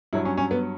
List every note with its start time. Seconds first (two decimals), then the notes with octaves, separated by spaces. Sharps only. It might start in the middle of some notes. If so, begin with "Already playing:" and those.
0.13 G2 F#3 E4
0.25 C#4
0.37 C#4
0.51 B3